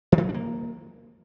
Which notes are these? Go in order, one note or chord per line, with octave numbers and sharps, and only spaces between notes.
E3
D#3
F#3
D4
A#3